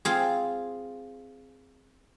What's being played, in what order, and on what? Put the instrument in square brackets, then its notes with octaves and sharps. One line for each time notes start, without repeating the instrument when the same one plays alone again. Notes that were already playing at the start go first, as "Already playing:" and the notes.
[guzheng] C4 F4 G#4